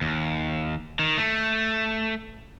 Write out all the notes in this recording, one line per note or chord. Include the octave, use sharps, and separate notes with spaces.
D#2
D#3
A3